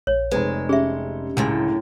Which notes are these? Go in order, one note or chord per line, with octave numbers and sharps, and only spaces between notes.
A#1 C#5
F1 G#3 C4 B4
C#4 G4 G#4 E5
C#2 F#2 A2 D3 G#5 C6